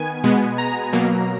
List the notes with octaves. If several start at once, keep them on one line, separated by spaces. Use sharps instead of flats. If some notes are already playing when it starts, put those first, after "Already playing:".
Already playing: D#3 B3 G#5
B2 G#3 B3
A#5
B2 F#3 A#3